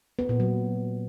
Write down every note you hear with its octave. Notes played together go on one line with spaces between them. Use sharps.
B3
A#2
F#3